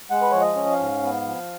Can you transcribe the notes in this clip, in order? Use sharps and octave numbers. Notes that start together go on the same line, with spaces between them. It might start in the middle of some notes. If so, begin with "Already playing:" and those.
G#3 F#5
B4
F3 C#5
D#5
C#4
F5
G#2
B3
F3